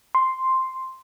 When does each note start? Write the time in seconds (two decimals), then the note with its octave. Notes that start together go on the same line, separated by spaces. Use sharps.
0.15 C6